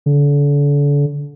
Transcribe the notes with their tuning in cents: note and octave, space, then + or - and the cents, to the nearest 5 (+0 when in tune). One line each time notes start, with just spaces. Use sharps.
D3 -35